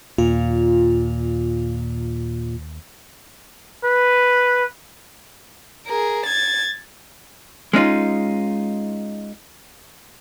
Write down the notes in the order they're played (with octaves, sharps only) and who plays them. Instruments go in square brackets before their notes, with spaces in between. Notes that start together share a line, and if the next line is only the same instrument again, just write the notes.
[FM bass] D#2 [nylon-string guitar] A#2 [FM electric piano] F4
[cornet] B4
[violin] G#4 A#4
G#6 A6
[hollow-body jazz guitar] G#3 C#4 D#4 F4